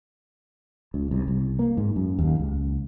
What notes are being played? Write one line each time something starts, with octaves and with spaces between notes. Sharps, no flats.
C#2
C2
C2
A#3
G#2
F#2
D#2
C#2